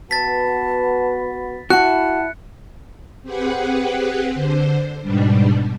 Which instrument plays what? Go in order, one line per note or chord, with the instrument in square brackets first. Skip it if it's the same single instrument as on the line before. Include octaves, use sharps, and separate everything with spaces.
[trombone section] B3 F#4 B4 [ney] A5 [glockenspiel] A6 B6
[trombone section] E4 [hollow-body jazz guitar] F#4 [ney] A5 [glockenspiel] F#6 C#7
[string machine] C4 G4 G#4 B4 F#5
D3 C5
G#2 B2 G3 D4